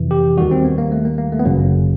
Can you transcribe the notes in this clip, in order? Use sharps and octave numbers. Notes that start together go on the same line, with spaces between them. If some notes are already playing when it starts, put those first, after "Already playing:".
Already playing: F2 C3 E3
G4
D#2 D#3 G3 F#4
C4
B3
A#3
A3
A#3
A#3
A3
B3
G1 F#2 C#3 F#3 A#3